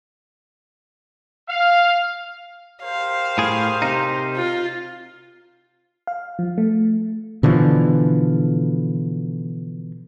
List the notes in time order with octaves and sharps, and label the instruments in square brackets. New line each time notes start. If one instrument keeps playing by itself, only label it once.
[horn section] F5
[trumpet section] G4 A#4 C5 [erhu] F5
[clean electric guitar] A2 G#4
C3 D#4
[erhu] F4
[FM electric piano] F5
F3
A3
[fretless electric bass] B2 D3 E3 F3